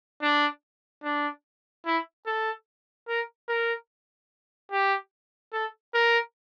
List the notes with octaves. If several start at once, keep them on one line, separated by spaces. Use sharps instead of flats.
D4
D4
E4
A4
A#4
A#4
G4
A4
A#4